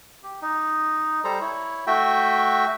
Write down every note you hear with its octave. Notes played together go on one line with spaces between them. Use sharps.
G4
D#4
G3 A4 C5 A#5
E4 C#5
A3 F#4 E5 G5